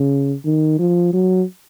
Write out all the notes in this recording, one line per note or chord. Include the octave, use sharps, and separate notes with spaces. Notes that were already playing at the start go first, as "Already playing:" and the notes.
Already playing: C#3
D#3
F3
F#3